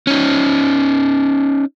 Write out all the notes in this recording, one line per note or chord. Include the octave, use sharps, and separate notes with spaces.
C#4 D#4